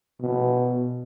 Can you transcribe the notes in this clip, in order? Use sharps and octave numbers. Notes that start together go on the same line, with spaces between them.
B2